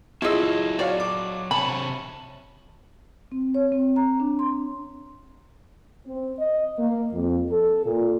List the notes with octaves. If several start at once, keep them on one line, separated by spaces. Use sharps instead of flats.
F#3 E4 F4 G#4 A4 D#5 E6
F#4 C#5 D5 F5
D6
C3 C#5 G#5 A5 B5
C4
C#5
C4
A#5
D4
C6
C4
D#5
A#3
F2
A4
A#2